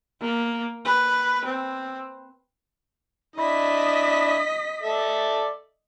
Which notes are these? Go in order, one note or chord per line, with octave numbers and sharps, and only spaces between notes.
A#3
B4
C4
D4 E4 D#5 B6
A4 D5 E5